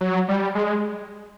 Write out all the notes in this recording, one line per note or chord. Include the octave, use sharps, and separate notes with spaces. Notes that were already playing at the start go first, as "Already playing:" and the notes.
F#3
G3
G#3